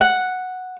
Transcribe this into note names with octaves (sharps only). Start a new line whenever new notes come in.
F#5